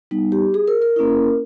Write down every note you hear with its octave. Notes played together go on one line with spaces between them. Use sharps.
G3 B3 D#4
G4
G#4
A#4
A#4
A#3 C#4 E4